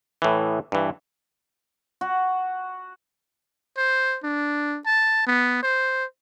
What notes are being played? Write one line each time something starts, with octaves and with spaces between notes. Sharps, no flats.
A2 E3
G2 E3
F#4
C5
D4
A5
B3
C5